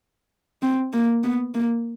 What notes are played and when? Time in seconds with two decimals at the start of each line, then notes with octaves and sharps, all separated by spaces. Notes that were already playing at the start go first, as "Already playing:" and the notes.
0.62 C4
0.93 A#3
1.23 B3
1.54 A#3